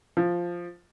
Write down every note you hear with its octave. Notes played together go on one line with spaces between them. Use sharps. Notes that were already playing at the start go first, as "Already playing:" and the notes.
F3